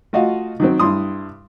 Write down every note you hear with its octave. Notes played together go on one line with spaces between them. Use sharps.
A3 F4 F#4 D#5 F5
D#3 F#3 C4
G2 E4 C6 D#6